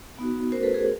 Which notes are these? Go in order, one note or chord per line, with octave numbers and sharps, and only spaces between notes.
B3 D#4 F#4
A3 C#4 F#4 A#4 C5
A4 B4
G#4 A#4